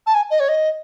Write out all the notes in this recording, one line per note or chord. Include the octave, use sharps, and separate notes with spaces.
A5
G#5
D#5
C#5
D#5